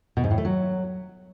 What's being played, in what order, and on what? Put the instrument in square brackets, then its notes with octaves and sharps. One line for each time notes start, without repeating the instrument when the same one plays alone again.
[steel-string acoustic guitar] B2
G#2
A2
A3
F#3